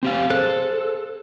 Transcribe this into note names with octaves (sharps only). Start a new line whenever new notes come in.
C4 G4 F5
G#4 A4 C5 F#6